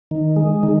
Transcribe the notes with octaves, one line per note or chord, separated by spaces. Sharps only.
D#3
G#3
D#3